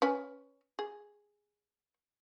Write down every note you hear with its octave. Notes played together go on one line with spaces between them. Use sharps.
C#4 B4 G#5
G#4